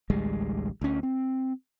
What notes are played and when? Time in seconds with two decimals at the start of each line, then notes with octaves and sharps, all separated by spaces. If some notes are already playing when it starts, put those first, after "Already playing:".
0.10 A1 D2 G3 G#3
0.82 D2 C#4
1.03 C4